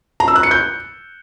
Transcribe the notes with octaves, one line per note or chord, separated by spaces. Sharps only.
A#5
E6
F#6
C#7
G6